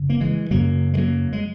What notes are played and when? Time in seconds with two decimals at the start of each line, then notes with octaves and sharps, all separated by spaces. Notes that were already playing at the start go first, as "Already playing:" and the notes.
Already playing: F#2 C#3
0.10 A#3
0.20 E3 G#3
0.51 F#2 C#3 F#3 A#3
0.93 G#3
0.97 F#3 A#3
1.33 G#3